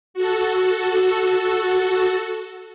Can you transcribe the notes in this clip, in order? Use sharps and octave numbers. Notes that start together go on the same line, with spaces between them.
F#4 A4